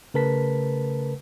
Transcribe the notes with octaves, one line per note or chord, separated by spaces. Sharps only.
C#3 A3 A#4 B4 A5 B6